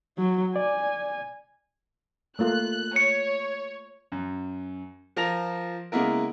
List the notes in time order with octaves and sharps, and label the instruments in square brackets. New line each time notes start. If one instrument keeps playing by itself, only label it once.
[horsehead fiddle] F#3
[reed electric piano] D5 [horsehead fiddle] G#5
[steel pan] A3 A#3 F4 [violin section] F#6
[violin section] C#5 [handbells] C#7
[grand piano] F#2
F3 F4 A#4 A#6 F7
C#3 G#3 A#3 B3 E4 A#4